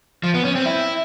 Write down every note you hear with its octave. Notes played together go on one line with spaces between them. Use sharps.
F3
B3
C#4
C4
E4